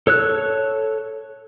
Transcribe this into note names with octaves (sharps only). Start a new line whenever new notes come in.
A4 C#5 E6 F#6